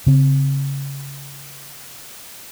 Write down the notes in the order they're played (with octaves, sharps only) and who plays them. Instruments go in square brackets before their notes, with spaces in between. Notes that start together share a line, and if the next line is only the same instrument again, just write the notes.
[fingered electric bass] C#3 C4